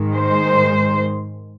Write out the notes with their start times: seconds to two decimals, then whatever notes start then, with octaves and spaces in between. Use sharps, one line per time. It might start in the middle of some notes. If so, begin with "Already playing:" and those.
Already playing: G#2 D#3 G#3
0.13 C5